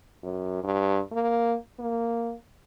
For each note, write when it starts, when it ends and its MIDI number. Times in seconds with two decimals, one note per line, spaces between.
0.23 0.59 42
0.64 1.00 43
1.12 1.55 58
1.79 2.33 58